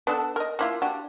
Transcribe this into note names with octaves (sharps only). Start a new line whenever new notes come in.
B3 D4 A4
A#4 D#5
A#3 E4 F4
D4 F#4 G4